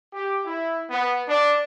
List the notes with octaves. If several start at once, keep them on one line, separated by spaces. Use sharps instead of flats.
G4
E4
B3
D4